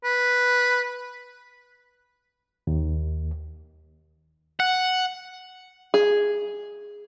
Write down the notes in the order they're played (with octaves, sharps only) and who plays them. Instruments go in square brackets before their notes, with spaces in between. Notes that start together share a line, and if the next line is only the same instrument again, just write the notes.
[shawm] B4
[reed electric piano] D#2
[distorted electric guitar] F#5
[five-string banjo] G#4